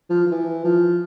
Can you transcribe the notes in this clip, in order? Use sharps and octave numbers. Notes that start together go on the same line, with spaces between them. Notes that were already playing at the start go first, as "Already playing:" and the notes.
F3
F3
E3
F3